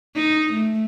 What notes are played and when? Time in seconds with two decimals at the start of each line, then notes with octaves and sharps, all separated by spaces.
0.15 D#4
0.53 A3